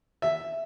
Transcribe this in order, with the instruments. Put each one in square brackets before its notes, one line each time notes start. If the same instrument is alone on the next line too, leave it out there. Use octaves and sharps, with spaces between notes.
[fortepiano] E5